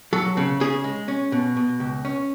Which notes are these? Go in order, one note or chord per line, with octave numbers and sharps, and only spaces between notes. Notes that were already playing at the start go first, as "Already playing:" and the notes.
F#3 A4
C#3
C#3 G#4
G#3
C#4
B2
B2
C#2
C#4